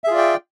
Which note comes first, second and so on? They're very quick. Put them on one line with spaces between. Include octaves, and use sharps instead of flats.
E5 G#4 F4 D5 G5